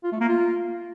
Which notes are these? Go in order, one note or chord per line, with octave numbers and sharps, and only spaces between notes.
F4
A3
A#3
F4